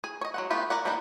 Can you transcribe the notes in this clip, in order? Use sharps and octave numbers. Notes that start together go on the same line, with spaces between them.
G#4 G#5
C#5 D#5
F#3 G#3 F#5
A3 B3 F4 G4
A#4 D5 F#5
E3 G3 A#3 D4 D#4